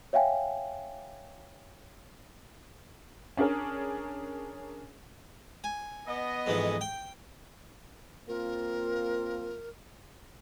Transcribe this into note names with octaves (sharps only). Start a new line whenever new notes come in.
C#5 E5 F5 G5 G#5
C#4 D4 G#4 A#4 C#5
G#5
B3 D#5
F2 G#2 E3
G5
A#3 C4 F4 A#4